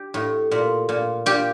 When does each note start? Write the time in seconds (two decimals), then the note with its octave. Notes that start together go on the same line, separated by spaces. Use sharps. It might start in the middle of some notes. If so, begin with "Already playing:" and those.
Already playing: G4
0.14 A2
0.51 A#2
0.89 A#2
1.26 A#2 G4